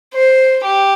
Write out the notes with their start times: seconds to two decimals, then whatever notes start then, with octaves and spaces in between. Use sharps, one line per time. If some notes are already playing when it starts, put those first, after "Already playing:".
0.14 C5
0.65 G4